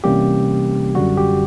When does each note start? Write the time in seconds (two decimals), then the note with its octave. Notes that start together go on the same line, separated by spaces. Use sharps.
0.04 C3 E3 G3 A#3 C#4 G4
0.95 F#2 D3 G3 F#4
1.17 G4